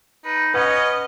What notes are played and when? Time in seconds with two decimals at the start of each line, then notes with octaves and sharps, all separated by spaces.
0.25 D#4 B4
0.54 C#4 B4 D#5 F#5